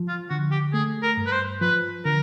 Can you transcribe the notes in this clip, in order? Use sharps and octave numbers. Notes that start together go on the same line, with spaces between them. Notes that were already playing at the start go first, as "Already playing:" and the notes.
Already playing: F3
F4
D3 F#4
G4
A3 G#4
A#4
G2
B4
C5
F3 B4
D3 A#4